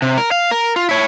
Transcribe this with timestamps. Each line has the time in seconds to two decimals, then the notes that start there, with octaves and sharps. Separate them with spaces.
0.02 C3
0.17 A#4
0.31 F5
0.51 A#4
0.76 F4
0.89 E4 C#5